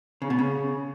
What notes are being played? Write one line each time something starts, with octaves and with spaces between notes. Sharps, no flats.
C#3
B2
C#3